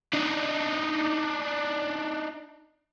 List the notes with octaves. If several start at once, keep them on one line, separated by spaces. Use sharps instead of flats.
D4 D#4